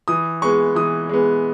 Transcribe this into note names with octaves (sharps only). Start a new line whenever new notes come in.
E3 D#6
G#3 B3 C#6
E3 D#6
G#3 B3